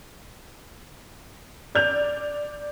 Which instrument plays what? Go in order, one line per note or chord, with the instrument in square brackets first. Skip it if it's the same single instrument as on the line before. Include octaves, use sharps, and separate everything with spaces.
[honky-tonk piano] D5 G6 F7